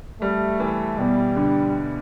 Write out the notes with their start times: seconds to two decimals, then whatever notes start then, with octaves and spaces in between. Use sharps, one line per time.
0.21 G3 A3
0.60 E3
0.98 B2 G3
1.36 D3